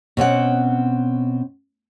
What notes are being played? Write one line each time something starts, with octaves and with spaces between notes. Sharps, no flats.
B2 C4 C#4 F#5